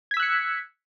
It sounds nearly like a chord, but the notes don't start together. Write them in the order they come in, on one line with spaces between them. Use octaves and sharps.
G#6 B6 E6 F#6 C#7